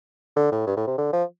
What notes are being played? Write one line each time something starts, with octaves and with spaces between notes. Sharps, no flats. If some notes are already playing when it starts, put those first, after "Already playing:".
D3
A2
G2
A2
C3
D3
F3